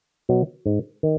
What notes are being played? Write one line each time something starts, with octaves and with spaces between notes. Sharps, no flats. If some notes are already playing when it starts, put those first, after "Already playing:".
B2 F#3
G#2
D#3